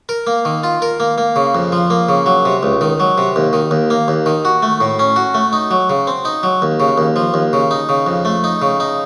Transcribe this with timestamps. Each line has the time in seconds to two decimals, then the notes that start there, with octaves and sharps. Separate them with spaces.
0.09 A#4
0.27 A#3
0.45 D#3
0.63 F4
0.82 A#4
1.00 A#3
1.18 A#3
1.36 C#3
1.55 F2
1.72 F3
1.90 A#3
2.09 C#3
2.26 F#3
2.45 C3
2.63 C#2
2.81 D#3
3.00 F#3
3.18 C3
3.36 D#2
3.53 D#3
3.71 D#2
3.90 A#3
4.08 D#2
4.26 D#3
4.45 F#4
4.63 A3
4.81 A2
4.99 C#4
5.16 F#4
5.34 A3
5.53 D#4
5.71 F#3
5.90 C#3
6.07 C4
6.25 D#4
6.43 F#3
6.62 D#2
6.80 C#3
6.98 D#2
7.16 F3
7.34 D#2
7.53 C#3
7.71 D#4
7.89 C#3
8.07 F2
8.25 A3
8.44 D#4
8.62 C#3
8.80 D#4